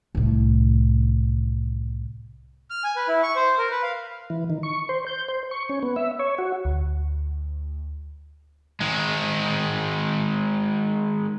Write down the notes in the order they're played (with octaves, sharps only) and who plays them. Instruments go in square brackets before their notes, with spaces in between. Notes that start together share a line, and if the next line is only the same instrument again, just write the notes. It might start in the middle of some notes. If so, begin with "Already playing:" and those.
[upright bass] C2 A2
[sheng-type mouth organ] F6
G#5
B4
E4
C#6
C5
A#4
B4
F5
[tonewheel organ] E3
D#3
C#6
C5
G6
C5
C#6
C#4
B3
E5
C#5
F#4
[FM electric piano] D2
[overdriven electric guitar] D#3 G#3